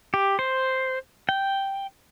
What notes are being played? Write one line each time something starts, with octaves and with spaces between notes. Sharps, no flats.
G4
C5
G5